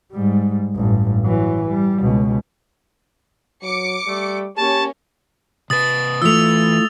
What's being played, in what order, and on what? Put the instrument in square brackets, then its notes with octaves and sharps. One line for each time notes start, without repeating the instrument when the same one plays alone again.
[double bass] G#2 G3
A1 G2
E3 F#3
G3
C#2 B2
[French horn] F#3 [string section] D6 C#7
[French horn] G3 [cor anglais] A3
[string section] A#3 C#4 [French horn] G4 [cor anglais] C#5 [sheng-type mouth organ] A5
[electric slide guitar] C3 B4 [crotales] D#6 A6
[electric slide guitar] E3 [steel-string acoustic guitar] A3 E4 F4 [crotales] E6 F7